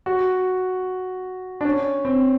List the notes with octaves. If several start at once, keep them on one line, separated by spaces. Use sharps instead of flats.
F#4
D4
C#4
C4